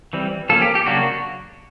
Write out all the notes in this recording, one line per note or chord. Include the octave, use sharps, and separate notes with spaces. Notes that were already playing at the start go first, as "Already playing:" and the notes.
E3 G3 C4
F3 A#3 C#4 A4
G4
G4
C#3 F#3 A#3 D4 F#4